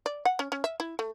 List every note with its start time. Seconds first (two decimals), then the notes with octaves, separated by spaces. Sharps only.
0.06 D5
0.25 F#5
0.39 C#4
0.52 C#4
0.64 E5
0.80 E4
0.99 A3